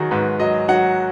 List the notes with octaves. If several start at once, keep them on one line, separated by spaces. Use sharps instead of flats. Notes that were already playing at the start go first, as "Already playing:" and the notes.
Already playing: D#3 F#3 F#4 G#4
G#2 B4
F#3 D#5
F#3 F#5